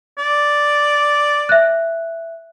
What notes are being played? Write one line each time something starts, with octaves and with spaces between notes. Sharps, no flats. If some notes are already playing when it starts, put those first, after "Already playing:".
D5
E5 F#6